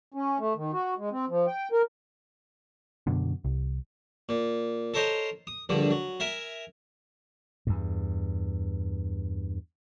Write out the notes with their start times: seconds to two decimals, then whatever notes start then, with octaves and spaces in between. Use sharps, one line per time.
0.14 C#4
0.39 A3
0.56 D#3
0.73 F#4
0.98 G#3
1.11 C4
1.29 F3
1.47 G5
1.72 A#4
3.07 F#2 B2 D3
3.45 C2
4.29 A#2
4.94 A4 A#4 C5 C#5 D#5
5.47 D#6
5.69 A#1 G2 D3
5.90 F#3
6.20 A#4 E5 G#5
7.67 E2 G2